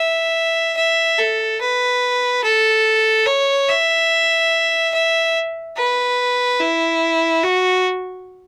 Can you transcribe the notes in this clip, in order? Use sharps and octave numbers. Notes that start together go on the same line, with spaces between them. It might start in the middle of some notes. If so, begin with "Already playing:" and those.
Already playing: E5
E5
A4
B4
A4
C#5
E5
E5
B4
E4
F#4